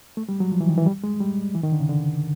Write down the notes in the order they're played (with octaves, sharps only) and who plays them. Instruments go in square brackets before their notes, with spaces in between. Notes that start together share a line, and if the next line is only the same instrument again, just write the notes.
[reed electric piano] A3
G3
F#3
F3
E3
D#3
E3
G3
G#3
G3
E3
D#3
D3
C#3
D3